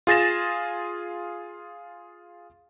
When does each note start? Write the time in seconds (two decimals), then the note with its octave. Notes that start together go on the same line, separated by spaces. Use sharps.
0.07 F4 G#4 A6 A#6 E7